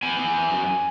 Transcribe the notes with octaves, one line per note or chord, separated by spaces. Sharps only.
B3 G#5
B3
E2
F#2